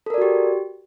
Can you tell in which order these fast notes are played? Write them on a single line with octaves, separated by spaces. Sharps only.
A4 A#4 D5 F#4 G4